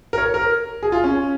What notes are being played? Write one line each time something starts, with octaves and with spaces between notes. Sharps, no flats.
A#4
C#5
A#4
G#4
F4
C#4